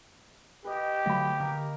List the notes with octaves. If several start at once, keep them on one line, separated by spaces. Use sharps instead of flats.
G4 B4 D#5
D3 F#3 A3 F5 B5
D3 A#3 A#4